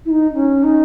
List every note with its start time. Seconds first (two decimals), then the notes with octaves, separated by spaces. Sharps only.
0.05 E4
0.10 D#4
0.34 C#4
0.63 D#4